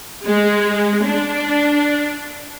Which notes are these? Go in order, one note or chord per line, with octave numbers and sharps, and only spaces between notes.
G#3
D4